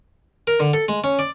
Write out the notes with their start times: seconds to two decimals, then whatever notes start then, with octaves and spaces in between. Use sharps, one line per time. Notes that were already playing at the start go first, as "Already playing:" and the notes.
0.47 A#4
0.60 D3
0.74 A4
0.88 G#3
1.04 C#4
1.19 D5